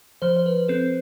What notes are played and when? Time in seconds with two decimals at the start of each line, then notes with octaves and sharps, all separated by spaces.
0.22 F3 C5
0.37 C5
0.46 B4
0.68 C4 A4